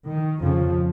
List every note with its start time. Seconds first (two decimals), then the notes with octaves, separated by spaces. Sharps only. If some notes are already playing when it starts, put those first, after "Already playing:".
0.08 D#3
0.40 F2 C#3 F3